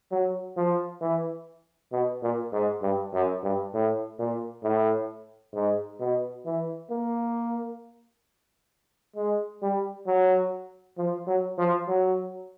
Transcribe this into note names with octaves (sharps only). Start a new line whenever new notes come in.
F#3
F3
E3
B2
A#2
G#2
G2
F#2
G2
A2
A#2
A2
G#2
B2
E3
A#3
G#3
G3
F#3
F3
F#3
F3
F#3